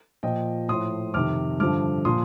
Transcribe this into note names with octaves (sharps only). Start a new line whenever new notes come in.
A#2 F3 D#5 G5
A2 F3 C6 D#6
F2 C3 D#3 D6 F6
G2 D3 F3 D6 F6
A#2 F3 C6 D#6